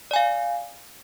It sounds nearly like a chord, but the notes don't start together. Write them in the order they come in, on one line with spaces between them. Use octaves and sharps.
D5 G#5 F5